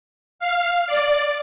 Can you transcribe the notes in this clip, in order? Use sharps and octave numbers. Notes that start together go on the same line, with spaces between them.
F5
D5